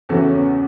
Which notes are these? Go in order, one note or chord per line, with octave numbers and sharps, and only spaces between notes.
E2 C#3 E3 F#4 A4
C#4
B3